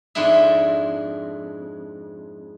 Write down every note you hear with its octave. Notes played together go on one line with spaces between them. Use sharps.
F2 G#2 D4 E4 E5